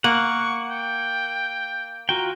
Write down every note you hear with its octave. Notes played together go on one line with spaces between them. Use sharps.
A#3 F#5 C#6
G5
F4 F#4 G5 A#5